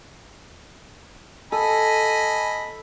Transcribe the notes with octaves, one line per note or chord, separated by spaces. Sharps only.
A4 D#5 G#5 B5